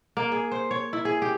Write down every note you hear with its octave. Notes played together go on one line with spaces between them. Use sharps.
A#3
G#4
C5
C#5
E4
G#4
G4